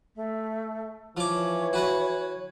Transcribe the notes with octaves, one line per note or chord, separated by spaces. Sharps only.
A3
E3 F3 C#5 D6
F#4 B4 F#5